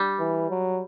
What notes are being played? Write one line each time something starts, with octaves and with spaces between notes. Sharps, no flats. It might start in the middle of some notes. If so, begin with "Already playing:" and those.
Already playing: G3
E3
F#3